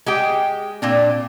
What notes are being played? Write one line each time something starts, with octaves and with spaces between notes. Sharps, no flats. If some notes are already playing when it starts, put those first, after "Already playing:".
G#3 G4 G5
A#2 C4 D4